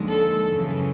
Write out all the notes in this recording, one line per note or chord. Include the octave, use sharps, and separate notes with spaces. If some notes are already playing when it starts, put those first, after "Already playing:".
Already playing: D#2 D3 F3 G#3
A4
F#2 C#3 E3 G#3